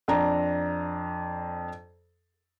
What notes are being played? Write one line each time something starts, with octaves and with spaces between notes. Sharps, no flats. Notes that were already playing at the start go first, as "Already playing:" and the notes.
F2 D4 A#5